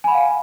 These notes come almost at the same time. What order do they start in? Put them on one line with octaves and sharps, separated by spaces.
G#5 B5 F#5 F5